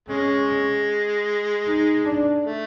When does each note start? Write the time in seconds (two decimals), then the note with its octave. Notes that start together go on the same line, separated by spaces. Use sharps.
0.09 G#3 C#4
1.66 D#4
2.05 D4
2.45 A3